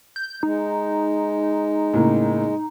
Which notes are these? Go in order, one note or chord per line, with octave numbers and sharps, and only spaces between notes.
G6
G#3 D#4
A2 C#3 A#3